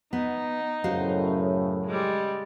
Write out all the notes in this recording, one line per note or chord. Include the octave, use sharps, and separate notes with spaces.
B3 D#4
F#2 A2 C#3 F#4 C5 F5
G3 G#3